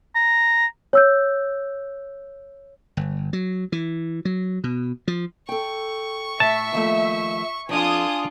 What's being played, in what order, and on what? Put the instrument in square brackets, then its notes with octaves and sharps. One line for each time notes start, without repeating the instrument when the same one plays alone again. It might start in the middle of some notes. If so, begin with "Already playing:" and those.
[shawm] A#5
[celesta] C#5 E6 G6
[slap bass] G1
F#3
E3
F#3
B2
F3
[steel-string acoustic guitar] A4 G5 [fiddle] C#6
[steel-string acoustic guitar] A2 [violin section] E5 [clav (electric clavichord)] A5
[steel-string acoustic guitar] D#2 F3 A3
[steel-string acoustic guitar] F2 F3 [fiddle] D4 F4 [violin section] G#5 D#6